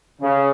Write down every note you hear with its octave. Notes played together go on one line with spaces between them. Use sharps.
C#3